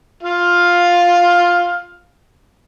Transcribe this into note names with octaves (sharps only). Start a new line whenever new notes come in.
F4 F5